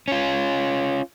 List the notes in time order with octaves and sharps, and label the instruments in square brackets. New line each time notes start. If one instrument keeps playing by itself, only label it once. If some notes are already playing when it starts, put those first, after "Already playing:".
[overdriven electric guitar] C#4 F4